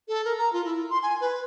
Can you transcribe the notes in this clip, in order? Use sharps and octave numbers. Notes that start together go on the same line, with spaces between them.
A4
A#4
A#5
F4
E4
C6
G#5
B4